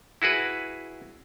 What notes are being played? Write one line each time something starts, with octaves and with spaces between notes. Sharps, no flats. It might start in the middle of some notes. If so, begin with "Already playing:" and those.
E4 F#4 G#4 B4